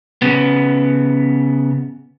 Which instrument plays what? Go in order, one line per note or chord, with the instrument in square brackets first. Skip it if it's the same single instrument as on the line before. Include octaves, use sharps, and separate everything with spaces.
[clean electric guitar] C#3 B3